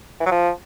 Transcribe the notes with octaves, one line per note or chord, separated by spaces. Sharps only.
E3
F#3
F3